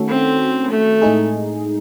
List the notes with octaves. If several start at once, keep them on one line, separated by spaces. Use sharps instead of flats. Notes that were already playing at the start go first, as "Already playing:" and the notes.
Already playing: D#3 A3 C#4 F#4 A4
C4
A3
A2 G#3 D#4 G#4